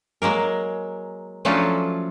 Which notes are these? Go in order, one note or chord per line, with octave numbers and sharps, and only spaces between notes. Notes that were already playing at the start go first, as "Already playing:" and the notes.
F#3 G#3 A#3 A#4
F3 F#3 A3 C#4 D4 F4